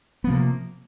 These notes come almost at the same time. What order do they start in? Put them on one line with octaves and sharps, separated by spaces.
B3 F3 C3 A#3